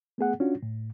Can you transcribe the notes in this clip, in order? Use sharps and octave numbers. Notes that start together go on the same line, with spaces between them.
A3 B3 G#4 F#5
C#4 D4 F4 F#4
A2